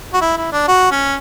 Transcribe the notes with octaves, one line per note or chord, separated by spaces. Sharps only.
F#4
E4
E4
D4
F#4
C#4